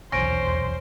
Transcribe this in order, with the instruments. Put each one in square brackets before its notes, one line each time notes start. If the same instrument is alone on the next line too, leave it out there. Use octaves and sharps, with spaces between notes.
[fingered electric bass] D#1 B1 E2 [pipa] C#4 [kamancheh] C5 [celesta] A#6 D7